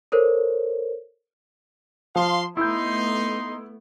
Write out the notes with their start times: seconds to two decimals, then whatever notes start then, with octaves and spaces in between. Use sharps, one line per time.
0.12 A4 A#4 C5 C#5
2.16 F3 F5 C6
2.57 A3 B3 D#4 E4 C6 G6